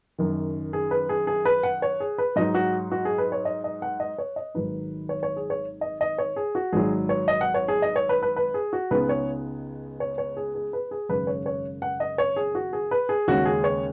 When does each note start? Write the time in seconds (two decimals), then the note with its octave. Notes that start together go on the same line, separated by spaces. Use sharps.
0.18 F#1 F#2 D#3
0.73 G#4
0.91 B4
1.09 G#4
1.27 G#4
1.45 B4
1.63 F#5
1.82 C#5
2.00 G#4
2.18 B4
2.36 G#2 F#3 D#4 D#5
2.54 F#4
2.92 F#4
3.05 G#4
3.18 B4
3.32 C#5
3.45 D#5
3.64 D#5
3.82 F#5
4.00 D#5
4.18 C#5
4.36 D#5
4.54 G#1 G#2 D#3 F#3 D#4 B4
5.09 C#5
5.23 C#5
5.36 G#4
5.50 C#5
5.81 D#5
6.01 D#5
6.18 C#5
6.36 G#4
6.55 F#4
6.73 G#1 G#2 F#3 G#4
7.09 C#5
7.28 D#5
7.41 F#5
7.54 C#5
7.68 G#4
7.82 D#5
7.96 C#5
8.09 B4
8.23 B4
8.36 B4
8.54 G#4
8.73 F#4
8.91 C#2 C#3 G#3 B3 D#4 B4
9.09 C#5
10.00 C#5
10.18 C#5
10.37 G#4
10.55 G#4
10.73 B4
10.91 G#4
11.09 G#1 F#2 C#3 B4
11.27 C#5
11.46 C#5
11.82 F#5
12.00 D#5
12.18 C#5
12.36 G#4
12.55 F#4
12.73 G#4
12.91 B4
13.09 G#4
13.27 D#2 C#3 G#3 C#4 F#4
13.45 G#4
13.64 C#5